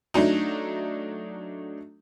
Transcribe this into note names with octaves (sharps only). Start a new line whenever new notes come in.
F#3 A3 D4 D#4